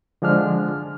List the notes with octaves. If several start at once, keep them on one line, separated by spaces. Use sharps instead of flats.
D3 F3 G#3 D4 F6